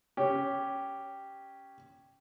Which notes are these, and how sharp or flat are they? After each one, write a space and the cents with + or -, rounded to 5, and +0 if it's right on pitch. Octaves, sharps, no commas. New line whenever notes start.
C#4 +0 G4 +0